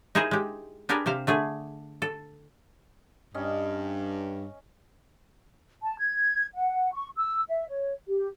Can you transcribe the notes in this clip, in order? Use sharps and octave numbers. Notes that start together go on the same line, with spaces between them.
D#4 E4 G#4 A#4 C5 D#5
G#3 G4
D4 G4 G#4 A#4 B4 D5
C3 G4 C5 F5
D3 A3 G#4
A4
G2 C#4 D#5
A5
G#6
F#5
C#6
E6
E5
C#5
G4